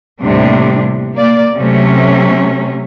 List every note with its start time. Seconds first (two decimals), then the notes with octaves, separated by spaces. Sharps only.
0.22 D#2 A2 C3 G3 D4
1.13 A#3 D5
1.55 C3 F#3 A3 C#4